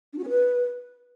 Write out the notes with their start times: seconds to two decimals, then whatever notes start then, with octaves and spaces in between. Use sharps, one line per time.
0.13 D4
0.18 F#4
0.24 C#4
0.29 B4